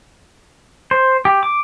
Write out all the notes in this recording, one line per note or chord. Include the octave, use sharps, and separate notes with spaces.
C5
G4
D6